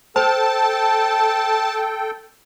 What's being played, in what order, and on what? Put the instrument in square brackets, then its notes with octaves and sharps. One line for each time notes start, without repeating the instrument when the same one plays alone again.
[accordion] A4 G5 [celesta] C5 [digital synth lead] A5